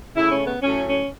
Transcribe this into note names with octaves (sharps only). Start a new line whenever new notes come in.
C#3 A3 E4
C#4
B3
A2 F#3 A3 C#4
C#4